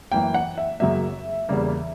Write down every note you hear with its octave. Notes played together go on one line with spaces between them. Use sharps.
F#2 E3 A#3 G5
F#5
E5
F#2 C#3 F#3 A#3 E5
E2 C#3 G3 A#3